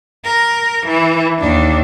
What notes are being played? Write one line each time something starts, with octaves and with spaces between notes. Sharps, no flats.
A#4
E3
D#2 D4